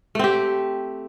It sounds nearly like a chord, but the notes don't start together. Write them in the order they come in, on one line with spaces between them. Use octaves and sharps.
A3 C4 G4